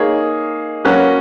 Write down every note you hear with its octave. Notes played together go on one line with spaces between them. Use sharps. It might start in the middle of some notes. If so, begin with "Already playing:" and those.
Already playing: A#3 D#4 G#4 C#5
F#3 A#3 C#4 F#4 B4